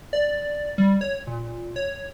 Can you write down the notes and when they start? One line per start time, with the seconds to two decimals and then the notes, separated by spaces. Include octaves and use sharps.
0.13 D5
0.78 G3
1.01 C#5
1.27 A#2
1.76 C#5